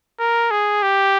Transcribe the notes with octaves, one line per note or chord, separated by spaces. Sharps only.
A#4
G#4
G4